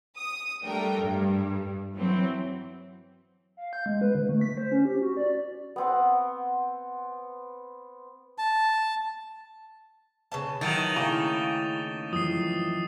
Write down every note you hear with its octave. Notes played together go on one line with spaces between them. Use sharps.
D#6
G3 A3 D4 A#4 G5
G2
E3 F#3 C4
F5
G6
G#3
B4
D3
A3
B6
C5
C#4
G4
F#4
D5
B3 C4 F#5
A5
C#3 B4 A5
D#3 E3 F#3 A6 D#7 F7
C#3 A3 A#3 E4 G#5 A#5 D6 G7
F#2 E3 F3 D#6 C7